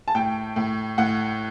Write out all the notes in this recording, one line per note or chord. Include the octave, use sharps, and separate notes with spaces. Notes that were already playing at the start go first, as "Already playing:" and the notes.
A5
A2 G5
A2
A2 F#5